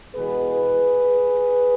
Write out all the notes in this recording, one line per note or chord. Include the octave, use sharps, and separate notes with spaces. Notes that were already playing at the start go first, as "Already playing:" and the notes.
E2 B2 G#3 B3 G#4 B4